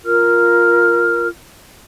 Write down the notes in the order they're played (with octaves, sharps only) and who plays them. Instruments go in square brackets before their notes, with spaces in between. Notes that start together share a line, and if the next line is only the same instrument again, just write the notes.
[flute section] F4 A#4 F6